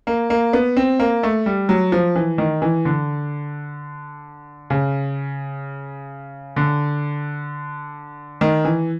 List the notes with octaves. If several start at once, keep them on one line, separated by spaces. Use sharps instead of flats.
A#3
A#3
B3
C4
A#3
A3
G3
F#3
F3
E3
D#3
E3
D3
C#3
D3
D#3
E3